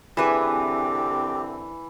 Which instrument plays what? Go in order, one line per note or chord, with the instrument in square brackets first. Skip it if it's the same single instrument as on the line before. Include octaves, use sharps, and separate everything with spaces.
[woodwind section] C2 D3 C4 [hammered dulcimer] E3 [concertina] G4 [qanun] G#4 B4 E5